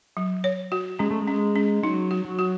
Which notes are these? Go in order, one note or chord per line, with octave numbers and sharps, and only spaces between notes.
F#3
C#5
F#4
G#3 C#4
A3
G#3
C#4
C#4
F#3 D#4
F#4
F#3
F#4